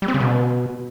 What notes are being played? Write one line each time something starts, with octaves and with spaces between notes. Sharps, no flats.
G3
C4
C#3
B2